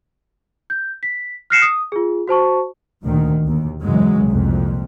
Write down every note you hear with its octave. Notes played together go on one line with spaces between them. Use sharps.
G6
B6
F6 F#6 A#6 C7 C#7 E7
D#6
F4 G#4
F#4 C5 A5 C#6
D2 A#2 D#3
D#2
F#2 C#3 E3 F#3 G#3
C2 F2 A#2